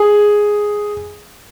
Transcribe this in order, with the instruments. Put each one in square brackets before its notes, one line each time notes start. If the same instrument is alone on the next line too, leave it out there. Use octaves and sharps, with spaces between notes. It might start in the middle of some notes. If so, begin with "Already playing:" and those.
Already playing: [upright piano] G#4